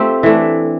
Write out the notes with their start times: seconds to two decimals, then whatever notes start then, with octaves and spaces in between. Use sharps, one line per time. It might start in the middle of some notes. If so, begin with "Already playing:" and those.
Already playing: A3 C4 F4 G4
0.23 E3 A3 D4